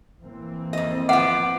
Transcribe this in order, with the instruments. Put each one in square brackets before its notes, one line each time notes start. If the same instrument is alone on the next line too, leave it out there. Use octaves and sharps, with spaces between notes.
[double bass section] E3 A#3 C4
[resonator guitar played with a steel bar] F2 D#5
[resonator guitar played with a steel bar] F3 B3 [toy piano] F#5 [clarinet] D6